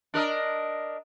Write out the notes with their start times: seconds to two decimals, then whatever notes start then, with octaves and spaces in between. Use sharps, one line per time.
0.14 D4 A#4 D#5